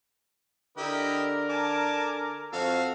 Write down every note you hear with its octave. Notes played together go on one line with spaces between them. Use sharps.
D3 E4 G4 A#4 D#5
G#5 A5 D6
F2 F#4 A4 F5